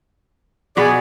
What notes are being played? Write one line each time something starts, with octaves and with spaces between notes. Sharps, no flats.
B2 B3 G#4 D5